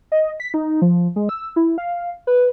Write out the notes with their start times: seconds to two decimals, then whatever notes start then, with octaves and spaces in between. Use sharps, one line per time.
0.12 D#5
0.40 B6
0.54 D#4
0.82 F3
1.16 G#3
1.29 E6
1.56 E4
1.78 F5
2.27 B4